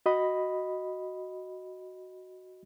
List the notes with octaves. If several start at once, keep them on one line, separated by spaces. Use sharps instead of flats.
F#4 D#5 B5